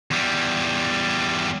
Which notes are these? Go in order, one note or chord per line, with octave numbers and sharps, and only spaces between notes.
E2 G3